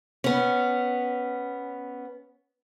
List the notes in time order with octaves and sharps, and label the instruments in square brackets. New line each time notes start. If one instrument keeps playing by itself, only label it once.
[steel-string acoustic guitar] B3 C#4